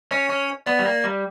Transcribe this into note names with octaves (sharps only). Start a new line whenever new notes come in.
C#4 C#5
C#4
B3 D5
G3
A#3
G3